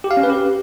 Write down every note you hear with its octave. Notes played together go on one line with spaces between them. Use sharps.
G4
F5
C#4
B4
G4